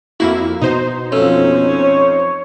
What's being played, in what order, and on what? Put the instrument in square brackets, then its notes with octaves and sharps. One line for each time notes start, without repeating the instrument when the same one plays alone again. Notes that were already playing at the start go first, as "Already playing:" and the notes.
[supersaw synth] F2 A#3 E4 [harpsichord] F#4
[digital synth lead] B2 [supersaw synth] D#4 C5
[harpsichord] F2 A3 [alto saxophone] C#4
[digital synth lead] C#5